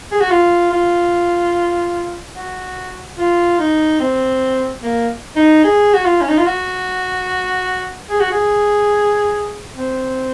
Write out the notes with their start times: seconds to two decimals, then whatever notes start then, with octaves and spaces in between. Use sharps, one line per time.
0.12 G#4
0.20 F#4
0.30 F4
0.71 F4
2.35 F#4
3.17 F4
3.59 D#4
4.00 C4
4.82 A#3
5.36 D#4
5.64 G#4
5.94 F#4
6.05 F4
6.21 C#4
6.29 D#4
6.38 F4
6.46 F#4
8.10 G#4
8.20 F#4
8.32 G#4
9.74 C4